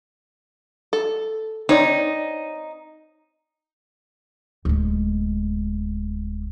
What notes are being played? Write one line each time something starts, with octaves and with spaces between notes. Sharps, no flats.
A4
C4 D#4 C#5 D5
D1 G#3